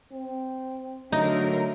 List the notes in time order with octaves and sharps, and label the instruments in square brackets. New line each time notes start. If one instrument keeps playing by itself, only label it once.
[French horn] C4
[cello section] D3 A#4 [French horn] F#3 [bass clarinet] A3 [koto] D#4